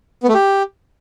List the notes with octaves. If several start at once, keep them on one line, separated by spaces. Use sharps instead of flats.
B3
A3
G4